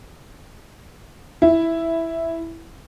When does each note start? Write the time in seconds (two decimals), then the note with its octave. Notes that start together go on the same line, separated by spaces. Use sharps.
1.42 E4